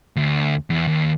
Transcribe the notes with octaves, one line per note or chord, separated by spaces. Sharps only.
D2
E2
D#2